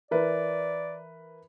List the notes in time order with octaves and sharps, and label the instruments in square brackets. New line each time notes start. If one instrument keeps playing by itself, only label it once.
[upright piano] E3 A#4 B4 [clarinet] D5